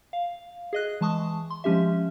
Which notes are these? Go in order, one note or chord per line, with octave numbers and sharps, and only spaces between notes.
F5
G#4 D#5 F#6
E3 G#3 A5 C#6 D#6
C6
F3 G#3 C#4 G4 E5